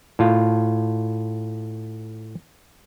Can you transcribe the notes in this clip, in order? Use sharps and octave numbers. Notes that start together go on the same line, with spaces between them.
A2 F4